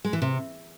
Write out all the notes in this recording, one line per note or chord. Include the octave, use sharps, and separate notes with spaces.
G#3
E3
C3